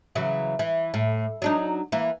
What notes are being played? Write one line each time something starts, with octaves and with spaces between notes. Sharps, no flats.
C#3 E3 F#3
E3
A2
F#3 D4 D#4
E3 A#3